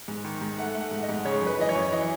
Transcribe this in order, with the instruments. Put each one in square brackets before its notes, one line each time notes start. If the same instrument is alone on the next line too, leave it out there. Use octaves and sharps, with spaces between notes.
[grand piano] G#2
D#3
G#2
A3 F#5
A3
F#5
G#2
D#5
G#2
C#3 C#5
F#2
B4
E3 D#5
C#5
F#2
C#5
E3 D#5